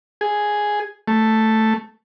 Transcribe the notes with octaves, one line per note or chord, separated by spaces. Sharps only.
G#4
A3